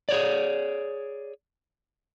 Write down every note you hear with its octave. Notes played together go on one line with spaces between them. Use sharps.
G#4 C#5 D5